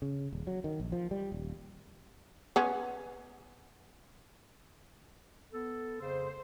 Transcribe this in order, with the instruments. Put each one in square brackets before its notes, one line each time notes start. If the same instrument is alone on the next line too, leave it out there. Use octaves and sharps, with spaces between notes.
[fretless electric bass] C#3
D#1
F#3
D#3
A#1
F3
G3
D#1
[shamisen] B3 C#4
[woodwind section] B3 A4
[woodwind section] F2 C#3 [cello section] C5